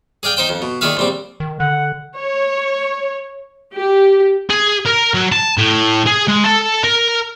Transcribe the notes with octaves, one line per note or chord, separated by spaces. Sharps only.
G#4 D5 F5 G5
D#4 C5 G5
F2
B2
A#2 D#3 G#4 E5 F5
A#1 G3 C4
D#3
D3 F#5
C#5
G4
G#4
A#4
F#3
A5
A2
G#4
G#3
A4
A#4